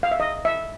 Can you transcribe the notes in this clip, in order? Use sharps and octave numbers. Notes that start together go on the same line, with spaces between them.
F5
E5
D#5
E5